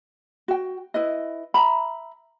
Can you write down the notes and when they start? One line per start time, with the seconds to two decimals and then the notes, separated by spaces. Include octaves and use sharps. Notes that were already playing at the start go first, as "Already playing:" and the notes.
0.48 F#4 G5
0.94 E4 B4 D#5
1.54 E5 A#5 B5